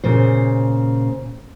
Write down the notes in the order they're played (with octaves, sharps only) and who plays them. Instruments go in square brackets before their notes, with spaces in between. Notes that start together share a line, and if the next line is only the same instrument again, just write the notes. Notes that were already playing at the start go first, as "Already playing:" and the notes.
[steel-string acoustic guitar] A#2 C#3 C5